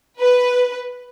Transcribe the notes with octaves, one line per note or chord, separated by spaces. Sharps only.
B4